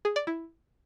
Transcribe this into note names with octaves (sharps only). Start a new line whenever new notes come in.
G#4
D5
E4